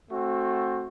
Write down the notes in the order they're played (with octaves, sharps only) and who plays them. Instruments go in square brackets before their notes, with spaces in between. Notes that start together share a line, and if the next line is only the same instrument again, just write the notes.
[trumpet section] A3 C4 F#4